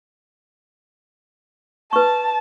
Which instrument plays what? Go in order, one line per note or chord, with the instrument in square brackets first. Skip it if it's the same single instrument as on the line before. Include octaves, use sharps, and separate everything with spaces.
[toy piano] B4 C#6 [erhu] A5